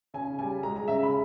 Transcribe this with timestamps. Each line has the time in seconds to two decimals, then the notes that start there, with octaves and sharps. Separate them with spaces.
0.14 C#3 G#5
0.39 G3 G#5
0.63 G#3 A#5
0.76 A#5
0.88 C#3 E5
1.03 B5